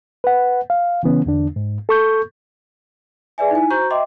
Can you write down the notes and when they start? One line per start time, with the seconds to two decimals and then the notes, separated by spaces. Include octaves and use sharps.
0.24 B4 F#5
0.70 F5
1.03 C#3 E3 B3 C#4
1.26 E2 D3 D4
1.56 G#2
1.89 A4 C#6 G6
3.38 G#4 B4 D5 E5 G#5
3.51 D#4 E4 G#5
3.70 F#4 C5 A#5 C#6 G6
3.90 D#5 E5 G5 C6 D6